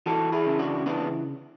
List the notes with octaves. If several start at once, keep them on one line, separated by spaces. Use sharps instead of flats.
E3 F#4 A4
E4 G#4
C#3
D4 F#4
E3 B3 D4